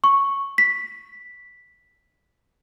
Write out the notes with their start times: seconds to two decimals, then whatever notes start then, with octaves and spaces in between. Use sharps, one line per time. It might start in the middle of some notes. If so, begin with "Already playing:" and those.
0.04 C#6
0.58 B6